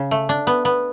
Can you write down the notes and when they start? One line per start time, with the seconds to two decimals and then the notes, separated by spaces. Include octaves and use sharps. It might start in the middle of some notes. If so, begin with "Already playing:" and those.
Already playing: C#3
0.11 A3
0.29 D4
0.47 B3
0.65 B3